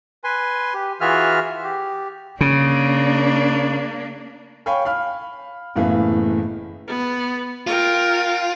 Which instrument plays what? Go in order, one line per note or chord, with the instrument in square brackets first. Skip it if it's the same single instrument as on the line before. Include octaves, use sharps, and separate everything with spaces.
[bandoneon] B4 G#5 C6
G4
E3 F4 F#4 G#4 E5 F6
G4
[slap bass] C#3 [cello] A#3 D4
[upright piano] C#5 F5 G5 G#5 B5 C#6
F5 B5 F6
F#1 A2 E3 B3 F5
[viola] B3
[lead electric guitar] F4 [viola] A#4 G5